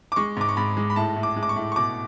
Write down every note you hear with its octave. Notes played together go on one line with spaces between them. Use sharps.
D6
G#3 C#6
G#2 D6
C#6
G#2 B5
G#3
B5
A2 A5
A2
D6
G#3
D6
C#6
A2
C#6
B2 D6